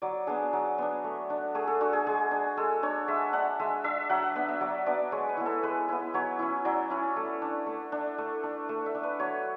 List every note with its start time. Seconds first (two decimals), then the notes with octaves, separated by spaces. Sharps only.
0.02 F#3 D5
0.27 B3 D4 G#4
0.53 F#3
0.78 B3 D4
1.04 A3
1.30 D4
1.55 A3 G#4
1.67 A4
1.81 D4 F#4
1.93 G#4
2.07 G#3 G#4
2.31 D4
2.57 G#3 A4
2.83 D4 C#5
3.08 G#3 E5
3.33 D4 F#5
3.59 G#3 E5
3.84 D4 E5
4.09 F#3 F#5
4.22 F#5
4.35 B3 D4 E5
4.48 E5
4.61 F#3 D5
4.86 B3 D4 D5
5.12 G#3 C#5
5.29 B4
5.37 B3 E4
5.46 A4
5.63 G#3 B4
5.88 B3 E4
6.14 F#3 C#5
6.39 C#4 E4
6.65 F#3 D5
6.90 C#4 E4
7.16 A3
7.42 D4
7.66 A3
7.92 D4
8.18 A3
8.43 D4
8.69 A3
8.86 E5
8.95 D4
9.03 B4
9.20 F#3 C#5